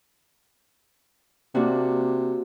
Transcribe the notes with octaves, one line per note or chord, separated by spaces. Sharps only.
C3 A#3 D4 F#4